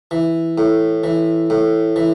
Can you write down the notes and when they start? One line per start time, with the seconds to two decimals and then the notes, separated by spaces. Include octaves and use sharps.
0.11 E3
0.58 A2
1.04 E3
1.50 A2
1.96 E3